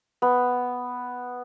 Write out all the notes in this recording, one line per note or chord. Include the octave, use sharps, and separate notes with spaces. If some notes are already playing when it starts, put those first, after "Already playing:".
B3